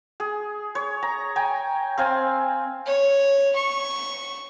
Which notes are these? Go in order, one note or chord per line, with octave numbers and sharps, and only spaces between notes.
G#4
C#5
A#5
G5 G#5 A#5
C4 F5 G#5
C#5
C#6